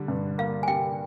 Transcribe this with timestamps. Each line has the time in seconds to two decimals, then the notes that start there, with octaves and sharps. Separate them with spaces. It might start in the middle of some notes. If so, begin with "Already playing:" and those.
Already playing: D3 G3
0.08 G2
0.38 A#3 F5
0.63 G#5
0.68 G3 G5